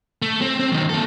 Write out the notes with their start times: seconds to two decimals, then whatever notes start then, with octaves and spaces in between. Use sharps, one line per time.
0.22 A3
0.41 C4
0.59 C4
0.72 F#2 D#3
0.90 A#3 A4